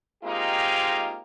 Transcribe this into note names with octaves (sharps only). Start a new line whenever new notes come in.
G#3 A#3 C4 D#4 F4 G4